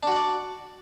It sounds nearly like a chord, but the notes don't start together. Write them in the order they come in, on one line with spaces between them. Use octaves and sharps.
D4 F#4 F#5 D5